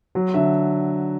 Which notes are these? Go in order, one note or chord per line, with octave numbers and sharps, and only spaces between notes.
F#3
D3 E5